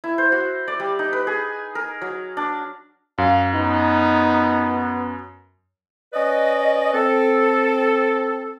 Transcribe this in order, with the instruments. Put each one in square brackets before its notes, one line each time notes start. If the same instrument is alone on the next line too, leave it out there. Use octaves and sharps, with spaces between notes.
[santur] E4
C5
F#4
D5
G3
D#4
B4
G#4
A#4
F#3
D4
[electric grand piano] F#2 [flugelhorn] F5
[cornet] B3 [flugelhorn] D#4
[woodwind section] C#4 B4 D5 D#5
C4 A4